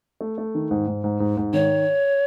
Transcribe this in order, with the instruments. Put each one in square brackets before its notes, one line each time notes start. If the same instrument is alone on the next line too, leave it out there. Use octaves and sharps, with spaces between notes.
[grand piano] A3
A3
D#3
G#2
G#2
G#2
G#2
G#2
[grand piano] D#3 [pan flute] C#5